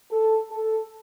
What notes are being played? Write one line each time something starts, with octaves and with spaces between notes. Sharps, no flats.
A4
A4